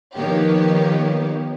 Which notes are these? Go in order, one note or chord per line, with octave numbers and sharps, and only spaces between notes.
D#3 F3 A#3 B3 G4 C#5